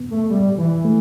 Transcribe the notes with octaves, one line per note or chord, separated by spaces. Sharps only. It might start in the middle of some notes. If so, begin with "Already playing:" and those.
Already playing: B3
A3
G3
E3
A3